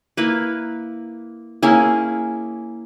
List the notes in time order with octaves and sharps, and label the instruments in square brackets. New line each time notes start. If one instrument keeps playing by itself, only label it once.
[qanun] A#3 E4 B4
A#3 C#4 E4 G#4